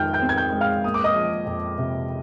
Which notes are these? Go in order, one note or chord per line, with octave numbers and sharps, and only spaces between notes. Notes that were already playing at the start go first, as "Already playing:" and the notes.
Already playing: F2 D#3 G#3 G5 F6 G6
G5 G6
C4
G#6
G5 G6
G#3
F5 F6
A#3 D#6
D6
D#5 D#6
F3
F2
C3